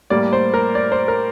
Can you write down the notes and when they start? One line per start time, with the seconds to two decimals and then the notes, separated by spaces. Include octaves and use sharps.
0.10 A2 G3 A#3 D5
0.33 C5
0.54 A#4
0.75 D5
0.92 C5
1.08 A#4